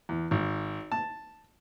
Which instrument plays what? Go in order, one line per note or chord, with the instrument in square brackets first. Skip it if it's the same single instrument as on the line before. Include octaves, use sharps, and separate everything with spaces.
[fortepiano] E2
G#1
A5